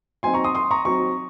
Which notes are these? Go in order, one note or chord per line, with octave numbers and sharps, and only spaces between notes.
F#3 C4 D#4 G#5 C6
A#5 C#6
C6 D#6
C6 D#6
A#5 C#6
F#3 C4 D#4 A#5 C#6